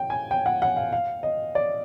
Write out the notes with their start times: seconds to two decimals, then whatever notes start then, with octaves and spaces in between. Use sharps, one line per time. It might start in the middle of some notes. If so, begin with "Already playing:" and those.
Already playing: G5
0.10 G#5
0.31 G5
0.46 F#5
0.62 F#5
0.77 F5
0.93 F5
1.23 D#5
1.55 D5